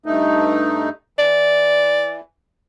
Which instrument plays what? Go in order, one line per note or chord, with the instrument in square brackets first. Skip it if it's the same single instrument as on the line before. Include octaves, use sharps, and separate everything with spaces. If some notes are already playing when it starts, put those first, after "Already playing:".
[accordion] G2 A3 D#4
[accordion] E3 [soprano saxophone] D5